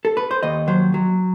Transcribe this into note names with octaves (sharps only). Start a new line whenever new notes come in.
A4
B4
C5
D#2 D#5
F#3 C5
F#3